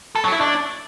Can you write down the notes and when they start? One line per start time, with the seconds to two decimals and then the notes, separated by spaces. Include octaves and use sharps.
0.15 A4
0.24 F#3
0.32 E4
0.41 D4